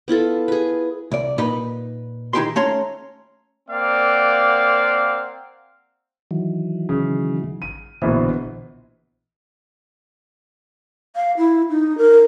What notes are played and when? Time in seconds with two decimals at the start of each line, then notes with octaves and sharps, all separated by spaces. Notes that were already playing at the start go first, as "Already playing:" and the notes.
0.08 B3 E4 F4 A4
0.48 G#4 B4
1.11 C2 D5
1.38 A#2 D#4 B4
2.33 D#3 D#4 E4 G4 G#4 C6
2.56 A3 C#4 C#5 A#5 C6
3.70 A#3 C4 D5 F5 F#5
6.31 D#3 E3 F#3
6.89 C#3
7.62 D#7
8.02 A#1 B2 D3 E3 C5
11.16 F5
11.38 E4
11.70 D#4
11.98 A#4